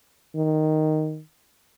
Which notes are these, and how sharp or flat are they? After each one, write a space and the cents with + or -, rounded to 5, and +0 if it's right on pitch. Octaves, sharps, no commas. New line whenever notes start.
D#3 -5